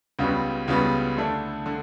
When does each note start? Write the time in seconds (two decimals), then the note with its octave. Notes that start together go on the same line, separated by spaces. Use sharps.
0.19 C#2 C#3 G3 B3 F#4
0.68 C#2 C#3 G3 B3 F#4
1.17 D3 A3 D4
1.66 D3